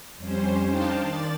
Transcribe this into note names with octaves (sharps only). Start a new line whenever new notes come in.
F2 G3 C#4 C5
D4 D#4 C5 F5 G5 A5
D#3 D5 A6